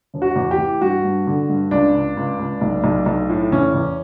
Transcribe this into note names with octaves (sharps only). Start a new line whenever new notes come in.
E1
F#4
E2
G4
E3
G2 F#4
G2
D3
G2
C#2 D4
C#2
C#2
C#2
B1
B1
B1
A2
E2 C#4
E2